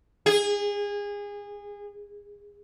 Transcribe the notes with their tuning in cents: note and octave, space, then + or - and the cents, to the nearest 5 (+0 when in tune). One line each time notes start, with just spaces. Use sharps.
G#4 -25